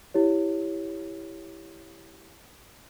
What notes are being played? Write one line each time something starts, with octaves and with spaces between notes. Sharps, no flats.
E4 G4 C#5